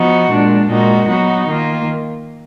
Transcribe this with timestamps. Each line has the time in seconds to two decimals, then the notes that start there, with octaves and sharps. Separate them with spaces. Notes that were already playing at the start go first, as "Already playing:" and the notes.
Already playing: F3 B3 D#4 F#4
0.30 A#2 G#3 D4
0.68 A#2 G#3 D#4 F#4
1.07 F#3 B3 D#4 F#4
1.46 D#3 A#3 F4